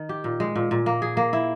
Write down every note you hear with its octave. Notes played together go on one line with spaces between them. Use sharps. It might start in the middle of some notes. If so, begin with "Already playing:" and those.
Already playing: D#3
G4
A#2
G#3
A#2
A#2
A#3
G#4
A#3
E4